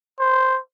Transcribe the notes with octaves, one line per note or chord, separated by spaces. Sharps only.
C5